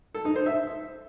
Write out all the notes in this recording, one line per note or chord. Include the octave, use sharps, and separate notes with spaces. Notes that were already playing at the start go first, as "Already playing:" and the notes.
A4
D#4
C5
E5